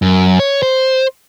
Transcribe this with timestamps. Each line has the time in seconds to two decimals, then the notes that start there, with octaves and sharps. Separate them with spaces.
0.02 F#2
0.40 C#5
0.63 C5